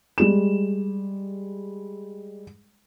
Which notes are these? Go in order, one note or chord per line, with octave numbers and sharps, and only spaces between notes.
G3 G#3 E7